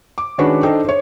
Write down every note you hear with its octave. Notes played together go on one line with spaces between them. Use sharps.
D6
D#3 G#3 C#4 D4 F#4 B4
D4 D#4 A4 C5 G5
C5 C#5